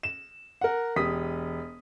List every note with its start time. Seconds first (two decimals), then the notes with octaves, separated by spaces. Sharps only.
0.03 E7
0.61 A#4 F#5
0.96 E1 G4 D#6 B6